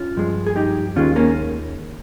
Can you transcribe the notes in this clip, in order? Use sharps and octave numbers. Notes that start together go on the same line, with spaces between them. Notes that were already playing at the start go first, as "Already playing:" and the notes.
Already playing: C#4 F4
G2 F3 G#3
G#4
D#4 G4
D#2 D#3 G#3 C#4 F4
A#3 C#4